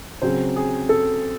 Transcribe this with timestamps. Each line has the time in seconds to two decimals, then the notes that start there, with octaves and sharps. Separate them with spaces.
0.22 C#3 F#3 C4 C5
0.56 G#4
0.89 A4